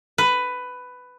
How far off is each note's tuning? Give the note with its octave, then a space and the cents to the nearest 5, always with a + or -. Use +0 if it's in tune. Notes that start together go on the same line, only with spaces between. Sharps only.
B4 +10